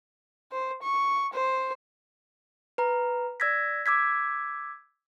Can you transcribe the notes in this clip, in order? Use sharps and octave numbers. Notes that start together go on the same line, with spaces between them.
C5
C#6
C5
B4 A#5
D5 E6 G#6 A#6 B6
D6 E6 G#6 B6